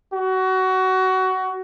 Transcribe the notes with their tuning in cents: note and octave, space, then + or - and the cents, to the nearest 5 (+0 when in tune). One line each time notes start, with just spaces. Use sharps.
F#4 +20